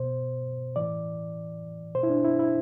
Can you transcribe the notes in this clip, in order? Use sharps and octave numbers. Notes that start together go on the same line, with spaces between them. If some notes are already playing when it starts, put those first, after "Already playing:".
Already playing: B2 C5
A2 E3 D5
B2 C5
E4
D4
E4
E4